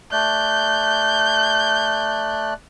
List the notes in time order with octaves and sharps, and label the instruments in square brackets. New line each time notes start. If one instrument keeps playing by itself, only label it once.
[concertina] A3 D5 F#6 [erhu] G6